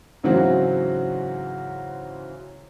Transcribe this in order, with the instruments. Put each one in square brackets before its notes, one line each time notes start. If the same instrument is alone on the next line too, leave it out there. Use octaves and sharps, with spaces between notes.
[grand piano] G#2 C#3 E3 F#3 C4 F#4